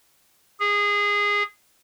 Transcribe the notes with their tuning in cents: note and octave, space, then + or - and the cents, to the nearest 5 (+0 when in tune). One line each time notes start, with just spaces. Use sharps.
G#4 -20